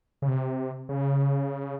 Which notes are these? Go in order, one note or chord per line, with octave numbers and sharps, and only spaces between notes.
C#3
C3
C#3